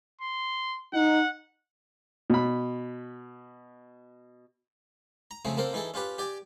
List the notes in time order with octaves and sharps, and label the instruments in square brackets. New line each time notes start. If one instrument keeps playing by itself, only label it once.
[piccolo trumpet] C6
[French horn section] D#4 [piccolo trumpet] F#5
[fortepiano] B2 B5
[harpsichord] A#5
C#3 F3 A3 C4 G#4
A#3 C4 A4 A#4 C5
E3 D#4 E4 G#4 A4
C#4 F4 G4 B4
G4 D5 G5 G#5